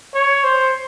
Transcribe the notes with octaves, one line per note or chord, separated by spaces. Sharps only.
C#5
C5